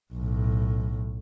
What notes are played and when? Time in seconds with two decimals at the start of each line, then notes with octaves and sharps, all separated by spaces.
0.14 B1 A2